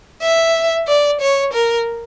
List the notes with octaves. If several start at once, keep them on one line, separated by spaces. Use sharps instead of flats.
E5
D5
C#5
A#4